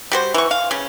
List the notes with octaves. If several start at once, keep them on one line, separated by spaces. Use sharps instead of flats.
G3 F#4 C5
E3 C#6
F5
C#3 C#4